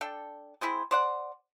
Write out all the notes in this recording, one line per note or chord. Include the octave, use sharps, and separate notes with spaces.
D4 A4 G5
C4 E4 G#4 C5
C5 D5 F#5